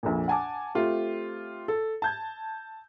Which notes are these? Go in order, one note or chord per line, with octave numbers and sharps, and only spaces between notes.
A#1 F2 A#2
F#5 G#5 A5 D6
A3 C4 F4 G4
A4
A5 G6 G#6